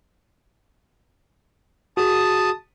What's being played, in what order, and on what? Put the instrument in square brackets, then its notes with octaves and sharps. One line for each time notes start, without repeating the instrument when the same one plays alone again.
[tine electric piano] F#4 G#4 [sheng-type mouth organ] A5 D#6